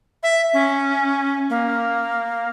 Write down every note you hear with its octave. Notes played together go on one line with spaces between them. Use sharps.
E5
C#4
A#3